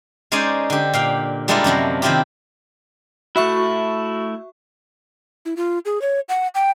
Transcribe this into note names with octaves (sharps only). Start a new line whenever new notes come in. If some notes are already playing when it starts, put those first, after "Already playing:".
G#3 C#4 D#4 C5 D5 G#5
D3 G4
A#2 F5 G5
G3 G#3 A#3 D4 E4 F4
F#2 C3 F3 F#3
C3 D#3 C4 E4 F4 G4
A3 E4 F#4 E5 C#6
E4
F4
G#4
C#5
F#5
G5